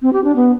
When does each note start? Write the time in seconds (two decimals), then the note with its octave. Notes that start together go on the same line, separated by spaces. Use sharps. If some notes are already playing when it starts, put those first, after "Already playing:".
0.02 C4
0.13 G4
0.24 D4
0.36 B3